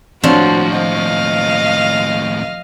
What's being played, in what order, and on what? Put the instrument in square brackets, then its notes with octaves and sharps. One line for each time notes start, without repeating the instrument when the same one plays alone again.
[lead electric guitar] D#2 A2 [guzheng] F3 [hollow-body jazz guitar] C4 D4 C#5 [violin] F#4
[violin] D#5 F5